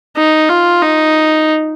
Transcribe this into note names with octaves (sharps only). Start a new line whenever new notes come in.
D#4
F4
D#4